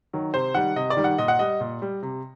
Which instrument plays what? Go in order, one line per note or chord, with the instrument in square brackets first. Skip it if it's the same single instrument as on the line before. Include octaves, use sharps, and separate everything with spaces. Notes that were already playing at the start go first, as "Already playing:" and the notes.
[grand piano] D#3 F#3
C3 C5
D#3 G3 F#5
C3 D#5
D5
D#3 G3
F#5
A#2 D#5
F#5
G3 D#5
A#2
G3
C3